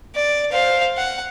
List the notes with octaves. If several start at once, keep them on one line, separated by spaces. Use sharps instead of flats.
D5
C5 F5
F#5